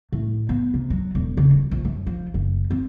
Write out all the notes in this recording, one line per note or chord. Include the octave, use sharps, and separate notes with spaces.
A2
B3
C3
F#3
E1
C#3
D#1
A#1
F#2
F3
F#1
C4